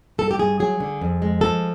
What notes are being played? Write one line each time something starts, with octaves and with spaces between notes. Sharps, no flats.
G2 A4
G4
G2 G#4
F#3 G#4
D3
F2
G#3
F3 A4